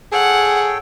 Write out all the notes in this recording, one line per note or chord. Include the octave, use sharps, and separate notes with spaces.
G#4 A4 C#5 F#5 G5